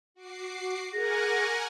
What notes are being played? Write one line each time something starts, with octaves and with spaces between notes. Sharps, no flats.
F#4 D6 C7
G#4 A#4 F#5 G#5 C#6 D6 A#6